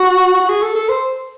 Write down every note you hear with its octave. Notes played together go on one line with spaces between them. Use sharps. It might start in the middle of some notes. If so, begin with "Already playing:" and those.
Already playing: F#4
F#4
G#4
A4
A4
C5